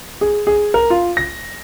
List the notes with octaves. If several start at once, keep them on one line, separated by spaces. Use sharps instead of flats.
G#4
G#4
A#4
F4
A#6